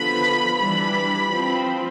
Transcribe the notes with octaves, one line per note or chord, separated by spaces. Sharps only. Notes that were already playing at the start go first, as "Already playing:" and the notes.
Already playing: D3 F3 B3 B5
E3 G3 D4 B5
F3 C4